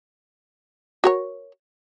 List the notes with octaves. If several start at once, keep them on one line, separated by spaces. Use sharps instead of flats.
F#4 A#4 C#5